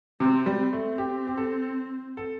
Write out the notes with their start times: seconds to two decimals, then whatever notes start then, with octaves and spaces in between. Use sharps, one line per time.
0.20 C3 C4
0.46 G3
0.59 C4
0.73 A3
0.98 G4
1.27 G4
1.37 A4
2.17 A4